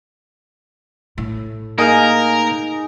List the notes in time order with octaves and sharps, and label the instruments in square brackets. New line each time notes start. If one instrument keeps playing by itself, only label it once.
[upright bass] A2
[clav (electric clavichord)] A#3 D#5 F5 [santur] D#4 G#4 [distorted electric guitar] A#4